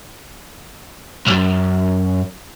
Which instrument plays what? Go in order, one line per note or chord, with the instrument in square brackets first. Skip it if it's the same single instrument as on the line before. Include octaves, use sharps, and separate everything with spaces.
[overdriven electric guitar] B1 F#2